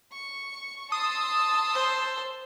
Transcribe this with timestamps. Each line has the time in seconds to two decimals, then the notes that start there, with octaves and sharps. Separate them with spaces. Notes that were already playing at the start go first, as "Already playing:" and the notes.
0.14 C#6
0.92 A5 C6 D#6 E6
1.74 C5